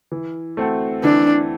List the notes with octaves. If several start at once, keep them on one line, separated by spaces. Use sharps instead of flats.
E3
A3 C4 F#4 A4
E3 D4